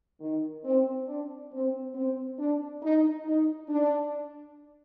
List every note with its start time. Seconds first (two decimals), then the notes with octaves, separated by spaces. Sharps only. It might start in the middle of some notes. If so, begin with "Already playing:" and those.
0.20 D#3
0.65 C4
1.07 D4
1.52 C4
1.94 C4
2.39 D4
2.82 D#4
3.25 D#4
3.69 D4